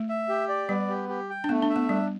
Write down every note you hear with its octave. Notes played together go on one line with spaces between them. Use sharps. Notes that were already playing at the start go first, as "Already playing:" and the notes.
Already playing: A3
E5
G4
D5
G3 B3
G4
G4
G5
D4
A3 B3
D4
E5
B3
G3 D4